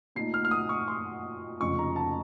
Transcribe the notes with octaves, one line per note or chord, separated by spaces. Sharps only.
A#2 A3 D#4 C7
F6
F6
D#6
C#6
C6
F1 F2 C#3 C#6
A#5
A5